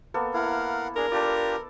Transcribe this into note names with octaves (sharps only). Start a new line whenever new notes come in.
A#3 B3 A4
E4 A#4 F5 F#5
D4 G#4 A#4
D4 F4 G4 A4 D5